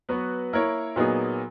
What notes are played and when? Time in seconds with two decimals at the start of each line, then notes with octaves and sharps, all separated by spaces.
0.09 F#3 B3 F#4 B4
0.53 A#3 E4 A#4 C#5
0.96 A#2 F#3 B3 D#4 G#4